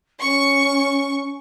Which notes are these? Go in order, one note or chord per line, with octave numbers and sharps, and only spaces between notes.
C#4 C#6